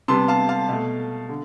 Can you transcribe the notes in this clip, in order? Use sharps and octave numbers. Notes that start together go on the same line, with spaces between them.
C3 G3 B3 A5 C6
F5 A5
F5 A5
B2 A3
D3